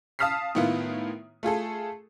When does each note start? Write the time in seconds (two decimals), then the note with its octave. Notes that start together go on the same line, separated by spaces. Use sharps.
0.19 F5 A5 D#6 F6 B6 C7
0.55 A2 D#3 B3 E4 F4
1.43 A3 F4 G#4 A4